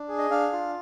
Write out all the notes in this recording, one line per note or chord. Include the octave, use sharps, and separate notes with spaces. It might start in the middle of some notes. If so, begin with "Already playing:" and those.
Already playing: D4
G#4
D#5
D4 F5
F4